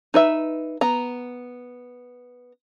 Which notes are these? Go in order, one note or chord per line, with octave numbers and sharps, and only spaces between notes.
D#4 B4 E5
B3 A#5